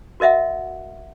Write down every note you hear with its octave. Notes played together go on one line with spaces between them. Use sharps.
F#4 A#4 D#5 E5 F#5